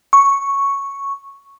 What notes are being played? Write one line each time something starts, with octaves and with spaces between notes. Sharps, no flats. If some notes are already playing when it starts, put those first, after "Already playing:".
C#6